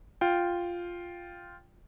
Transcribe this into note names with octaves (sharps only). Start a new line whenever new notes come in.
F4 G5